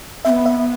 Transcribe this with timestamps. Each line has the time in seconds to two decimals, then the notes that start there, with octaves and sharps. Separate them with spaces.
0.25 C4 E5
0.30 B3
0.46 E5